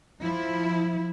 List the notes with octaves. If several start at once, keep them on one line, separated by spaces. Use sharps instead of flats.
F3 E4